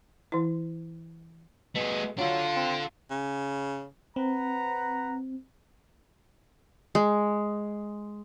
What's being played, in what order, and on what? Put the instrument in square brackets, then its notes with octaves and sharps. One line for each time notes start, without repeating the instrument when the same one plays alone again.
[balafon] E3 E4
[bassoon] B2 [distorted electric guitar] A3 G#4
[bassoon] F#3 [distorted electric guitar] D4 A4 [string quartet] F4
[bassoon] C4
[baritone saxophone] C#3
[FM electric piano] C4 [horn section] B4 F#5 A#5
[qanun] G#3